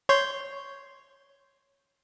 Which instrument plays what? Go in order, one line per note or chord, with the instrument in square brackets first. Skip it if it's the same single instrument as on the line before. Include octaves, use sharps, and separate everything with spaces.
[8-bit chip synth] C#5 C6 G6